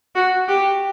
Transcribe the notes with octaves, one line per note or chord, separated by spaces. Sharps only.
F#4
G4